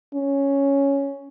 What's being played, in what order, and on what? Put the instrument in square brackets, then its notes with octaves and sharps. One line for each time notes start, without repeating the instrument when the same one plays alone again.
[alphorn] C#4